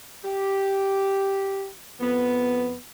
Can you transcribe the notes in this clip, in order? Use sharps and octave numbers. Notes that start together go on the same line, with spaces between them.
G4
F2 B3